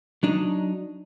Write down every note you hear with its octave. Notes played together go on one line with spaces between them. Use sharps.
F#3 D4 D#4